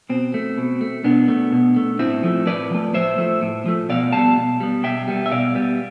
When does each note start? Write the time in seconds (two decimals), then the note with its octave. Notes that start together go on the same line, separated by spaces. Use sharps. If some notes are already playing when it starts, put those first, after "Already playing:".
0.09 B2 C4
0.34 A3
0.58 B2
0.81 A3
1.04 B2 B3 D4
1.28 A3
1.52 B2
1.76 A3
1.99 A2 C4 E4
2.23 F3 A3
2.47 A2 B4 D5
2.71 F3 A3
2.94 A2 C5 E5
3.18 F3 A3
3.42 A2
3.66 F3 A3
3.89 B2 D5 F5
4.13 G3 B3 F5 A5
4.36 B2
4.60 G3 B3
4.83 B2 E5 G5
5.08 G3 B3
5.26 E5
5.31 B2 D5 F5
5.55 G3 B3